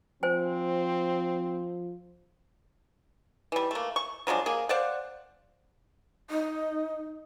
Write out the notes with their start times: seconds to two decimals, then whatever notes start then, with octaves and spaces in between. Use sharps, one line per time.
0.23 F3 C4 C5 G#5
3.52 E3 G3
3.71 A3 A#3
3.96 C#6
4.27 F3 F#3 G#3 D4
4.46 A#3 G#4
4.69 C5 D5 F5 F#5
6.30 D#4